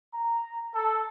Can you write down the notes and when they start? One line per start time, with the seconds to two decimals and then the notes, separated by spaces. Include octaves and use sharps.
0.13 A#5
0.74 A4